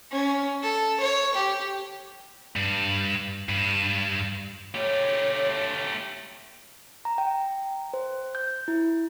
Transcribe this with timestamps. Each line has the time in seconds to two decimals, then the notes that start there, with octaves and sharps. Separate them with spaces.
0.12 C#4
0.62 A4
1.00 C#5
1.35 G4
2.56 G2
3.49 G2
4.74 A3 G4 C#5
7.05 A#5
7.18 G5
7.94 C5
8.35 G6
8.68 E4